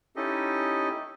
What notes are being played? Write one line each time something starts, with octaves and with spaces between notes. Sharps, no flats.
C#4 D#4 E4 G4 A4 D#5